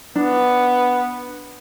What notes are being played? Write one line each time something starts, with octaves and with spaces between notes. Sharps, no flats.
B3 D4